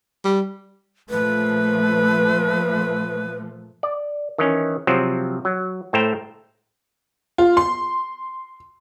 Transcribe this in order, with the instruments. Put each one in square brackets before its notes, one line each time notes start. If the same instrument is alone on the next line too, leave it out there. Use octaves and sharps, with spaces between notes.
[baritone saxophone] G3
[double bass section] A#2 F3 A3 [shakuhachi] B4
[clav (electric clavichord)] D5
D#3 E3 C#4
C3 F3 F#3 C4
F#3
A2 A3 C5 E5 G5 A#5
[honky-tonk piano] F4
C6